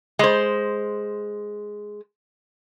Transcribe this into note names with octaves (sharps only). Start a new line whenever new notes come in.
G#3 C5